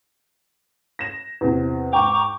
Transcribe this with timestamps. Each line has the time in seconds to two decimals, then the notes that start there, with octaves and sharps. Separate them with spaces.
0.99 A#6 E7
1.41 E2 C3
1.93 G#2 G5 A#5 C#6 D6